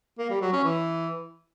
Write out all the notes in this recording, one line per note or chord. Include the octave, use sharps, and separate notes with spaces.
A#3
G3
F#3
C#4
E3